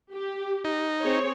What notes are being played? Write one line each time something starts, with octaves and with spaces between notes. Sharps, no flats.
G4
D#4
C4 G#4 C#5